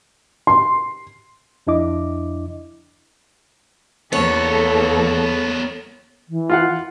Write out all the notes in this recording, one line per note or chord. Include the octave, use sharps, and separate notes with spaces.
C6
F2 D4 E4 D#5 D6
E2 A#3 B3 A4 A#4 C#5
E3
F4 F5 F#5